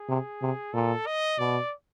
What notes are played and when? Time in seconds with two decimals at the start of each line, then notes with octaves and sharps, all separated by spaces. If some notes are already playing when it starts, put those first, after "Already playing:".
Already playing: G#4
0.09 C3
0.42 C3
0.73 A#2 A4
1.07 D#5
1.39 B2 D5